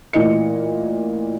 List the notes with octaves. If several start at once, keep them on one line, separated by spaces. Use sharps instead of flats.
A1 A#2 E3 D#5 C#7